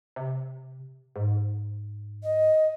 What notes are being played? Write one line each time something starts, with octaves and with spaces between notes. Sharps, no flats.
C3
G#2
D#5